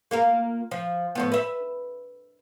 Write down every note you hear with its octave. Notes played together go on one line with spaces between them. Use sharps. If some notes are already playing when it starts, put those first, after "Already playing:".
A#3 F4 A#4
F3
A2 F3 B3
B4 E5